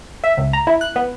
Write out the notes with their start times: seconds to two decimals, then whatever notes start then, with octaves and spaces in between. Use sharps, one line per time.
0.24 E5
0.37 C#2
0.53 A#5
0.67 E4
0.81 F#6
0.96 B3